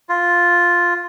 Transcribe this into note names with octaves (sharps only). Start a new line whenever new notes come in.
F4